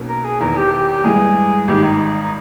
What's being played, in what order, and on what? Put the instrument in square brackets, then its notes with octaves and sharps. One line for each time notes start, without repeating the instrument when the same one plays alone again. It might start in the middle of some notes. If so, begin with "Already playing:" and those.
Already playing: [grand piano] B1 B2 A#3 C#4
[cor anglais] A#4
G#4
[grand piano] E1 E2 D#3 [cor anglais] A#4
[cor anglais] G4
G4
G4
[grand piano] G2 E3 G#3 [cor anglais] G#4
[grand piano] G#1 G#2 D#3 [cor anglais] G4
[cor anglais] D#4
D#4